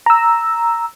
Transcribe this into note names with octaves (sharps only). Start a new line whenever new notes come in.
A#5 E6